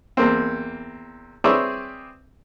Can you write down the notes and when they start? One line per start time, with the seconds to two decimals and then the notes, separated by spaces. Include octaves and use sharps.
0.17 E2 A#3 C4
1.44 C4 G#4 B4 C#5 D5 E5